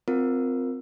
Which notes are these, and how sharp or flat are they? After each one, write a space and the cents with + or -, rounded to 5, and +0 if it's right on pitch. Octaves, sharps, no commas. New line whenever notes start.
C4 -15 F4 +10 A#4 +0